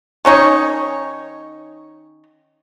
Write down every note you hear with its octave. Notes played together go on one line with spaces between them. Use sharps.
D#3 C#4 D#4 C#5